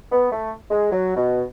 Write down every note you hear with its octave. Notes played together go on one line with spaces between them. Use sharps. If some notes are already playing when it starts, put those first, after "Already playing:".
B3
A3
G#3
F#3
B2